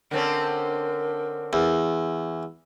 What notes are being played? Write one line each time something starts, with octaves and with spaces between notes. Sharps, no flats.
D3 C4 C#4 A#4
E2